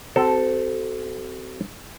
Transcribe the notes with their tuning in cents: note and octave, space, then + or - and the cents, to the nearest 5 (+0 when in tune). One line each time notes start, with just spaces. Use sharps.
C4 -15 F#4 +35 A4 +0